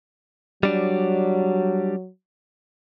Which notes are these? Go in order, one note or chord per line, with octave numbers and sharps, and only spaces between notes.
F#3 G3 D4